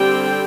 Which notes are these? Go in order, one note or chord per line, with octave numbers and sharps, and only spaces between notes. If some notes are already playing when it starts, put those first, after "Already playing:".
Already playing: D3 G3 C4 G5